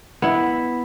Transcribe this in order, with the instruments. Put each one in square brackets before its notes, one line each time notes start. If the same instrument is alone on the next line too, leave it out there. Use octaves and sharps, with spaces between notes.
[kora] B3 E4